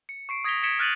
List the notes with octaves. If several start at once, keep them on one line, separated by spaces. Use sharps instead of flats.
C#7
C#6 C7 D7
D#6 G#6 A#6 B6 F7 G7
G#6 B6 C#7 D7 E7 G7
F6 F#6 A6 D#7 F7 F#7